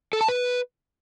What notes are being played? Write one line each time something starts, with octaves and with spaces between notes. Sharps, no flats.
A4
A5
B4